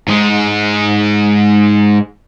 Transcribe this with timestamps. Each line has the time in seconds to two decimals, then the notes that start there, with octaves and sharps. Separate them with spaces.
0.08 G#2 G#3